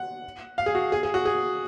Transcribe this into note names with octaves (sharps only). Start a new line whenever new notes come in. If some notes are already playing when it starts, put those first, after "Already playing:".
Already playing: F#5
F5
G#4
F#4
G#4
G#4
F#4
G#4